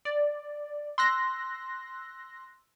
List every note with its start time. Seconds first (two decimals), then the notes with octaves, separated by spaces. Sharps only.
0.05 D5
0.98 C6 E6 F#6 A#6